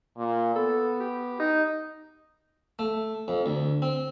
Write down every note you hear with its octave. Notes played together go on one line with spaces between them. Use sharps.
A#2
B3 A4
G4
D#4
A3
F2
D2
C4